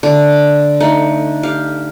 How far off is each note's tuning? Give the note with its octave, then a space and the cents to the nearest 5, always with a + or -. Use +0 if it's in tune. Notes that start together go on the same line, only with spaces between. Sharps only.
D3 +0 A3 +0 A#5 +25
A3 +20 D#4 +10
G4 +0 F5 +0